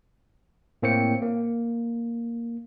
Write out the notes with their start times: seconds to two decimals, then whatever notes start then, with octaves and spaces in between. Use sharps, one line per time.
0.82 A2 A#3 C4 C#5 G5 C#7
1.22 A#3